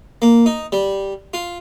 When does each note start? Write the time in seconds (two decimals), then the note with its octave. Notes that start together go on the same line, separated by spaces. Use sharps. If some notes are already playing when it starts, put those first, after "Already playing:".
0.22 A#3
0.46 D#4
0.72 G3
1.34 F4